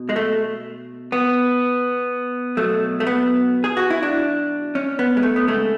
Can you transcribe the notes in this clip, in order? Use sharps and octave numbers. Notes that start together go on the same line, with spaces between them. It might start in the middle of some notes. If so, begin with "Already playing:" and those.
Already playing: B2
G#3
A3
B3
B2 F#3 A3
A3
B3
G#4
F#4
E4
D4
C#4
B3
G#3
A3
B3
C#3 G#3 A3